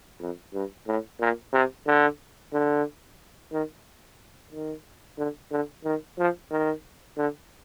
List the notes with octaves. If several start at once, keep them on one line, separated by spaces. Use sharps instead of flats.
F2
G2
A2
A#2
C3
D3
D3
D#3
D#3
D3
D3
D#3
F3
D#3
D3